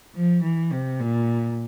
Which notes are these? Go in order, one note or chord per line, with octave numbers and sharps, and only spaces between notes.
F3
E3
C3
A#2